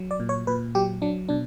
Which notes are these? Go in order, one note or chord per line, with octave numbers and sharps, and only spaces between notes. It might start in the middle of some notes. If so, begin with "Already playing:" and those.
Already playing: F#3
D5
A#2
C#5
A#2 B4
F#3 G4
F#3 D4
B2 D4